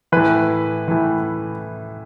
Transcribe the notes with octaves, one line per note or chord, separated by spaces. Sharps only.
A2 E3 B4
A2 E3